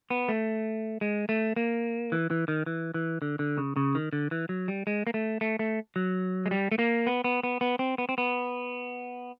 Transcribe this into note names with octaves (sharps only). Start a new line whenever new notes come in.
B3
A3
G#3
A3
A#3
E3
E3
D#3
E3
E3
D3
D3
C#3
C#3
D#3
D3
E3
F#3
G3
G#3
A#3
A3
A3
A3
F#3
G#3
G3
A3
A#3
B3
B3
B3
B3
C4
B3
C4
B3